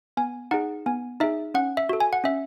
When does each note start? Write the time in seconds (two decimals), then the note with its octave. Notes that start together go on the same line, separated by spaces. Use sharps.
0.17 B3 G#5
0.51 D#4 G#4 F#5
0.86 B3 G#5
1.20 D#4 G#4 E5
1.54 C#4 F#5
1.77 E5
1.89 F#4 A4
2.00 G#5
2.13 F#5
2.24 C#4 E5